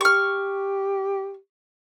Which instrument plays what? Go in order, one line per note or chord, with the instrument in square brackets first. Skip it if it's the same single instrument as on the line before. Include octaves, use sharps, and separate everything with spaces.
[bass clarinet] G4 [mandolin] C#6 F6